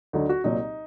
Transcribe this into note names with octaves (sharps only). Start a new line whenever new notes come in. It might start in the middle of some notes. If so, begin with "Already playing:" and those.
D2 D3 F#3 D#4
F#4
C2 A#2 F#3 D#4